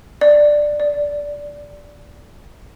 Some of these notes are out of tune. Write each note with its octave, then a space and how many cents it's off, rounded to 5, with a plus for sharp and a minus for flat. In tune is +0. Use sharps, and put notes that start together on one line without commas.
D5 +10
D5 -10